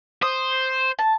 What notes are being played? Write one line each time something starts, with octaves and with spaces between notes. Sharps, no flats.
C5 D#6
A5